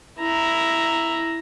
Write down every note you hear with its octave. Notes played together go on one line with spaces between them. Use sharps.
E4 A#5